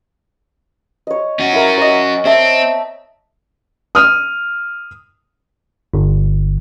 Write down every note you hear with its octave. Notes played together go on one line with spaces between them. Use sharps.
C#5 D#5
C#4 F#4
E4 A#4
C#5 D#5
C4 D#5 E5 A5
D#6 F6
G1